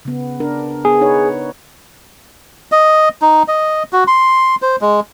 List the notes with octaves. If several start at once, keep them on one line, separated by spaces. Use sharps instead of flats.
C#3 B3
D4 A#4
B3 G#4
D#4 B4 C#5
D#5
D#4
D#5
F#4
C6
C5
G#3